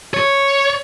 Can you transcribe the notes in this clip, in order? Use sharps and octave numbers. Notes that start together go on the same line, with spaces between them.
C#5